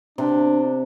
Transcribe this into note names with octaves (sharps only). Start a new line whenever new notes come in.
C3 D4